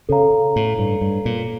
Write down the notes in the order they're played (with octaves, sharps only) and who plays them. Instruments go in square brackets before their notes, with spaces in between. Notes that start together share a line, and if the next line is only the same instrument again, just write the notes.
[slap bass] C#3 [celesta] A4 C#5 F5 A#5
[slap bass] A2
G2
G2
A#2